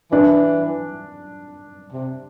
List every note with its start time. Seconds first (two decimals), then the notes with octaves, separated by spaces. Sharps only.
0.11 E3 D4
1.93 C3